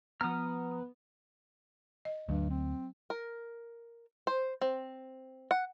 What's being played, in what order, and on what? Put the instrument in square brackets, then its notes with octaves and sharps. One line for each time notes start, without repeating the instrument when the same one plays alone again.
[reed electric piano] F3 A#5 [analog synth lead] B3 [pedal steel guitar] D#6 F6
[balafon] D#5
[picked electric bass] D2 [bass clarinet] G2 [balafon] F#3
[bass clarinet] C4
[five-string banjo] A#4
C5
C4
F#5